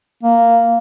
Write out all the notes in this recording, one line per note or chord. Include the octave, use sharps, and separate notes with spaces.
A#3